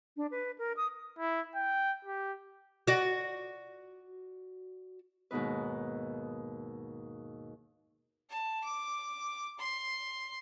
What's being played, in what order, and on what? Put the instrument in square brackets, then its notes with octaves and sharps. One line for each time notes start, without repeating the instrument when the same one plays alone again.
[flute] D4
B4
A#4
D#6
[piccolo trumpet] E4
G5
G4
[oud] F#4 D5
[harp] D#2 G#2 B2 D#4 B4
[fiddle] A5
D6
C6